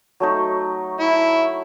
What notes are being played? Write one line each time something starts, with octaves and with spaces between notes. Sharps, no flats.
F#3 A3 D#4
E4